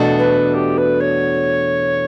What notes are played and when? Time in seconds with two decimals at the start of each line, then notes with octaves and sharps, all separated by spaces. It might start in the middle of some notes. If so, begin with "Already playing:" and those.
Already playing: E2 B2 A3 D4 F#4
0.19 B4
0.54 G4
0.78 B4
1.00 C#5